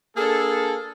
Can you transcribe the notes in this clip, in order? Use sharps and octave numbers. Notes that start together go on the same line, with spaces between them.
A#3 D4 G#4 A4